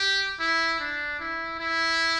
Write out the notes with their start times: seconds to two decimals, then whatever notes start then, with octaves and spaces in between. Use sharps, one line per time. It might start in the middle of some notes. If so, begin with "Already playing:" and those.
Already playing: G4
0.40 E4
0.79 D4
1.19 E4
1.59 E4